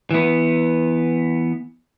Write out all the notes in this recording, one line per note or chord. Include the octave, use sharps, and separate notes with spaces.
E3 B3